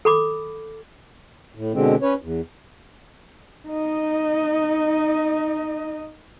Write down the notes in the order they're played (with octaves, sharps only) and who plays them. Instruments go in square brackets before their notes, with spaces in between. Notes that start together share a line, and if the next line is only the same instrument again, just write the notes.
[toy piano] A4 B5 D6
[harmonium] A2
B2 D3 G#3 C4
C#4 B4 C#5
E2
[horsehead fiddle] D#4 D#5